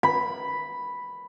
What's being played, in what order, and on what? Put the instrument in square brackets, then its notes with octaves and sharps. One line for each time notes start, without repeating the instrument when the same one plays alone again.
[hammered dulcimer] B5